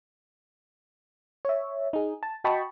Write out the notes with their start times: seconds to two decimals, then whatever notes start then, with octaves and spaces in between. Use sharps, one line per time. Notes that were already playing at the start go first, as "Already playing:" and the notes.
1.45 C#5 E5
1.93 D#4 G#4
2.23 A5
2.44 F#4 D#5 G5 A5 B5 C#6